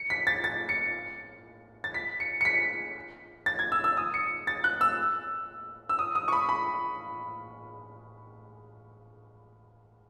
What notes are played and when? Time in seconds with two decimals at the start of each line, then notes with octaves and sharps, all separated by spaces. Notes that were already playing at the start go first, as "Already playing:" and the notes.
Already playing: C#7
0.10 B6
0.27 A6
0.44 A6
0.69 C#7
1.84 A6
1.94 B6
2.20 C#7
2.41 C#7
2.45 B6
3.46 A6
3.59 G#6
3.72 E6
3.84 E6
3.97 D#6
4.14 C#7
4.47 A6
4.64 F#6
4.81 E6
5.89 E6
5.99 D#6
6.15 D#6
6.28 C#6
6.32 B5
6.49 B5